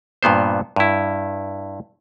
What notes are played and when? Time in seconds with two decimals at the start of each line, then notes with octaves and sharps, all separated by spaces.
0.23 G2 A#2 B3 C5
0.76 G2 E4